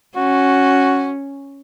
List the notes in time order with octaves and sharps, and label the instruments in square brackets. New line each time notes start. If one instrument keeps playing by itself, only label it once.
[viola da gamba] C#4 [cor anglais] F#4